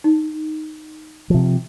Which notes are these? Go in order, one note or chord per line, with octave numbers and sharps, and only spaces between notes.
D#4
C3 F3